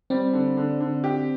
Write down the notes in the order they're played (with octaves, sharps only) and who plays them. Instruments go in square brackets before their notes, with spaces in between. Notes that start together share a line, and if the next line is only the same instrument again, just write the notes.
[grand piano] G3 [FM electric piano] C4
[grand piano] D3
D3
D3
G4